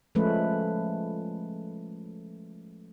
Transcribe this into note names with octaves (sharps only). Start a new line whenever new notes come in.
F3 G#3 A3 C#4 B4